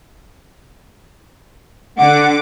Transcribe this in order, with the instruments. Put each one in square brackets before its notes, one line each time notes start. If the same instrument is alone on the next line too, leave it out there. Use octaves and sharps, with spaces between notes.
[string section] D3 D6 [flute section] F#5